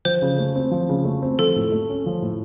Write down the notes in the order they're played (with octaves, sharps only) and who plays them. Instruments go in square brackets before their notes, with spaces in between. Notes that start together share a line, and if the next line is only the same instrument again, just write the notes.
[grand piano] F3 [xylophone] C5
[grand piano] C#3
A3
C4
F3
C#3
A3
C4
[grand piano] F3 [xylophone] A4
[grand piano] A2
A3
C#4
F3
A2